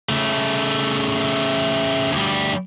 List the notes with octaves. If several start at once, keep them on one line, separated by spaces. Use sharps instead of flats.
C#3 A3
D2 G3